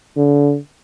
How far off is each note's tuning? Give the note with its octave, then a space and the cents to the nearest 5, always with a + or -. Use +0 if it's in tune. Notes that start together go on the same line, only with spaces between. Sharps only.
D3 -35